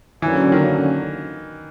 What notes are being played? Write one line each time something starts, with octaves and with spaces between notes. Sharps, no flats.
D3 E3 F#3 A#3 C#4
D#3